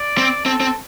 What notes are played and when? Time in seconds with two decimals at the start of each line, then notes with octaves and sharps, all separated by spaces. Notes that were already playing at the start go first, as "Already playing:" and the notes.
Already playing: D5
0.18 C4
0.46 C4 A4
0.61 C4